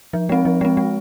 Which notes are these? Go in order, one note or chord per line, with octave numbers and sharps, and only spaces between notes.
F3
G#3 C4
F3
G#3 C4
G#3